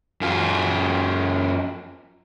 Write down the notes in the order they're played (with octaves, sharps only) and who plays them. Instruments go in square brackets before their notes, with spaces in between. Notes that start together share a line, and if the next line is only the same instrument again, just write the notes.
[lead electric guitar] F#2 F4